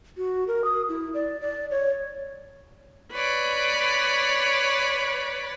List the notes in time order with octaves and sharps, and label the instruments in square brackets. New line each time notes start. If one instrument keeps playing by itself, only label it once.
[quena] F#4
A#4
D#6
E4
D5
D5
C#5
[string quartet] B4 C#5 D5